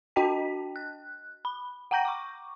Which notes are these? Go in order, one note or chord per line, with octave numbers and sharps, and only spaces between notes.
D4 F#4 D#5 G5 A5 B6
F#6
B5
F#5 G5 A#5 G6 A#6
C#6 D6